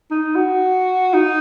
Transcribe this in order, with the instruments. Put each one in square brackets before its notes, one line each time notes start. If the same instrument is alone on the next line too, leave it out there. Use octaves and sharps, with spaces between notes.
[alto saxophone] D#4
F#4
D#4